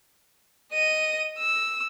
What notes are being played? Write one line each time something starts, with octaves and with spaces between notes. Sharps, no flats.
D#5 D#7
E6